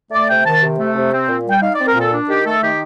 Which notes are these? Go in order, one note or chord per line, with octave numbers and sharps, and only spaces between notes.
A3 D5
C3 G5
D#3 A5
C3
A3
C3
C4
A#2
G3 G5
D#4 F5
C4 D5
A#4
A#2 A4
D4
D#3 G4
A3 A4
D#3 G4